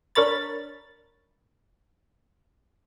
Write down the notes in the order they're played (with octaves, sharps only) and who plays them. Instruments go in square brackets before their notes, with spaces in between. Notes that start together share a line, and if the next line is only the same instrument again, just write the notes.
[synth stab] D4 A#4 C#5 B5 A6